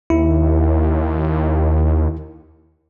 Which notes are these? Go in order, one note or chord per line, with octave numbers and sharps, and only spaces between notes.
D#2 E4